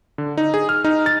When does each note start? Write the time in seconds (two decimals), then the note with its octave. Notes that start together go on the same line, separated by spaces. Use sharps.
0.18 D3
0.37 D#4
0.54 G#4
0.69 F6
0.84 D#4
1.06 A6